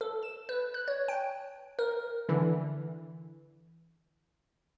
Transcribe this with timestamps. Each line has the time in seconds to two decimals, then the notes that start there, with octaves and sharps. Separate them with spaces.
0.01 A4
0.23 E7
0.49 B4
0.74 F#6
0.88 C#5
1.08 G5
1.79 A#4
2.29 D3 E3